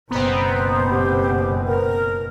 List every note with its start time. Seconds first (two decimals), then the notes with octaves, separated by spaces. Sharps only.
0.11 F#1 B2 B3 C4 C5 A#5
0.90 G4
1.66 A#4